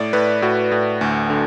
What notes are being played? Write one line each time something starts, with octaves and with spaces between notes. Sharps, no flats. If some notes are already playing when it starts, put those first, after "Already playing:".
Already playing: A2 D5
A2 B4
A2 F#4
A2
D2
D3